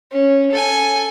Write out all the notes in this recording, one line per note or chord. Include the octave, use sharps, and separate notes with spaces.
C#4
A4 G#5